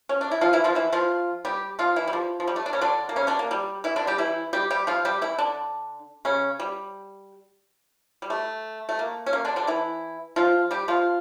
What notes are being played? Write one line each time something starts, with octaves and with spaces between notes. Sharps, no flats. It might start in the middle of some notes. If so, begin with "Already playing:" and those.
C#4
D4
E4
F3 F4
E3 E4
F3 F4
E3 E4
F3 F4
G3 G4
F3 F4
E3 E4
G3
F3
F3
G3
A3
D4
C#3 C#4
D3 D4
A#3
C#3 C#4
D3 D4
A#3
G3
E3 E4
D3 D4
G3 G4
E3 E4
G3 G4
G3 G4
F3 F4
G3 G4
E3 E4
D3 D4
C#3 C#4
G3
G3
A3
A3
A#3
C#4
A#3
D3 D4
D3 D4
E3 E4
F3 F4
G3 G4
F3 F4